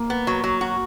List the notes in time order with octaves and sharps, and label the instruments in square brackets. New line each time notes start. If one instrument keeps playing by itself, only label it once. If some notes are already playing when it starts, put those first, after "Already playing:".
Already playing: [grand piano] A#3
[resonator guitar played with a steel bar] B3
F#3
F#3
F#4